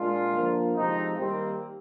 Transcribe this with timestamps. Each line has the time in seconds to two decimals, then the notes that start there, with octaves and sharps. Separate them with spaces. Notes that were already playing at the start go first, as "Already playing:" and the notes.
Already playing: A#2 G#3 D4 F4
0.33 D3 F3 A#3
0.75 C3 F3 G#3 C4 D#4
1.17 D#3 G3 A#3 C4